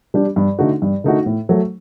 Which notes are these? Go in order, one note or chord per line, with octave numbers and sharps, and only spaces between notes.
G3 D4 G4
G2
D3 A3 D#4 F#4
G2
D3 A3 D#4 F#4
A2
F#3 A3